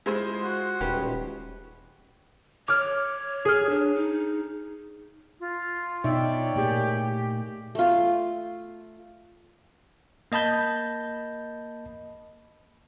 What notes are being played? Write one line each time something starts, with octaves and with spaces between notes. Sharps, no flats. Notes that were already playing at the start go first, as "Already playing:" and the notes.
G#3 E4 F4 C5
F#4
D#1 C#4 G4 B4
C#5 D6 F6
G#4 F6
D4
D#4
F4
B2 D#4 C#5 D5 E5 G5
A#2 A3 A#3 G4 G#4
A3 F4
A#3 D#5 A5 B5 G6